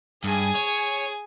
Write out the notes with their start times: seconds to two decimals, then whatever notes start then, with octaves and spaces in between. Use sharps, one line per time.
0.24 G2 G#4 G#5
0.56 C#5